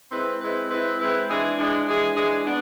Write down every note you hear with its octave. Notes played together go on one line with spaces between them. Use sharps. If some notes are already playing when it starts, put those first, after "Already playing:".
G#3 C4 E4 B4
G#3 C4 E4 B4
G#3 C4 E4 B4
G#3 C4 E4 B4
E3 G#3 D4 G#4
E3 G#3 D4 G#4
E3 G#3 D4 G#4
E3 G#3 D4 G#4
B3 D4